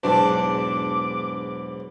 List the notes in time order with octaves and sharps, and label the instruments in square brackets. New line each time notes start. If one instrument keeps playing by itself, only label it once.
[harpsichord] B1 E2 G#2 [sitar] D4 [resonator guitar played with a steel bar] A5 [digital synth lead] D6